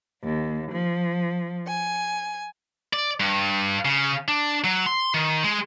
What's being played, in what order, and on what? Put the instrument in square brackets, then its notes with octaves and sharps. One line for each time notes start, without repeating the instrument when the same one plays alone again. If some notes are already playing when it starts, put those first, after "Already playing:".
[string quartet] D#2
F3
G#5
[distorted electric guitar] D5
G2
C#3
D4
F#3
C6
D#3
G#3